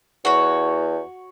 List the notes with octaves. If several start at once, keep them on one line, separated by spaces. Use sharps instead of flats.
E2 F#4 C#5